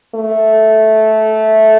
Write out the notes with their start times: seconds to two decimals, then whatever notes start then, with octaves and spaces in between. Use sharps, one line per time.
0.15 A3